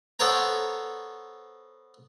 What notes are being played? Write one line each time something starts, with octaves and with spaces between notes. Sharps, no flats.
B3 A4 C5 C#5 G5 A#5